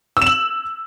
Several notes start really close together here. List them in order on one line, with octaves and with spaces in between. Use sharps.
E6 E7 F#7